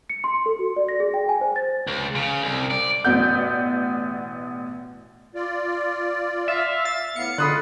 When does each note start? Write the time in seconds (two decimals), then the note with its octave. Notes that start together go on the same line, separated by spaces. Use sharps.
0.10 C#7
0.24 C6
0.46 A4
0.59 F#4
0.76 D5
0.89 A#6
1.00 G#4
1.14 G5
1.29 G#5
1.41 C5
1.56 A6
1.87 C#2
2.15 C#3
2.42 C2
2.71 D5
3.04 A1 B2 B3 D5 F#5 G6
5.35 F4 D5
6.48 E5 F5
6.85 A6
7.16 A2 B3 F5 C#7
7.38 D3 G#3 F4 B5 D#6 F#6